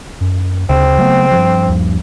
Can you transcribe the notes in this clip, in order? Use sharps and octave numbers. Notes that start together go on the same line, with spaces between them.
F#2
D2 C#3 C4
F#3 A3 B3
G2 F3
D#2